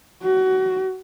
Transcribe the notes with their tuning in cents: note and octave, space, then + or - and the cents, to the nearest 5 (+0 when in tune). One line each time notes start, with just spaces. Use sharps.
F#4 +25